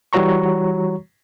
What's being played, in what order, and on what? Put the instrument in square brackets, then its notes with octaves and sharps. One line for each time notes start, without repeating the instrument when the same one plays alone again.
[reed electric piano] E3 G3 F#4 C#5 A#5 C#6